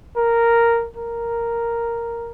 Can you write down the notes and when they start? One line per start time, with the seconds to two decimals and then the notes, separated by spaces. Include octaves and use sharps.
0.16 A#4
0.96 A#4